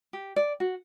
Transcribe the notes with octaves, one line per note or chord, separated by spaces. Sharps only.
G4
D5
F#4